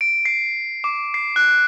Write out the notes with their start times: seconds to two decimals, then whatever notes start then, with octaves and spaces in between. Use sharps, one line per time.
0.01 D7
0.25 C7
0.84 D6
1.14 C7
1.36 F#6